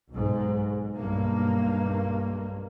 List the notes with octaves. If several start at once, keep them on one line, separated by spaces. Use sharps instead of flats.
B1 G#2
B1 G2 A#3